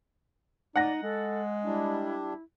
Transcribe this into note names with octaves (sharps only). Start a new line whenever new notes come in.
D#4 D5 F#5 A#6
G#3 A4
G3 D4 E4